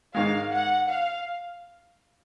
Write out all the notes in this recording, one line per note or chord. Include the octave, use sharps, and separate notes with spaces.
G#2 D#3 G#3 F5
F#5
F5